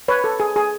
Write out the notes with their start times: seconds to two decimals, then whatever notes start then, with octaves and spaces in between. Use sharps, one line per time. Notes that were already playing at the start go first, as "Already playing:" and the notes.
0.08 B4 C#5
0.24 A4
0.40 G#4
0.56 G#4